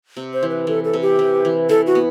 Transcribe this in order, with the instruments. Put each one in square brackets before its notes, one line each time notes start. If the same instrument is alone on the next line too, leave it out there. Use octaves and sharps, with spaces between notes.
[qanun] C3
[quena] C5
[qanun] E3
[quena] B4
[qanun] E3 [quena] A4
[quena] A4
[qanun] C3
[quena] G4
[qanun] E3
E3
[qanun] E3 [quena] A4
[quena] F#4
[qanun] B3